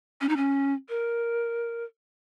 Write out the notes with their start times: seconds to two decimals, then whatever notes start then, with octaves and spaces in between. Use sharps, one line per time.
0.21 C#4
0.29 D#4
0.37 C#4
0.89 A#4